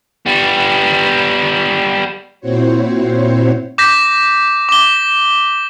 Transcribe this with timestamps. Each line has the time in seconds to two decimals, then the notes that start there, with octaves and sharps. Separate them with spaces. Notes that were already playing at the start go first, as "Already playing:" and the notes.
0.26 G3 B3
2.40 A#2 C4 E4 F#4 C5 C#5
3.78 D6 G6 A#6 B6
4.69 D6 G7